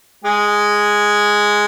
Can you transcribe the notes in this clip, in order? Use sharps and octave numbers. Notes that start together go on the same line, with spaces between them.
G#3 G#4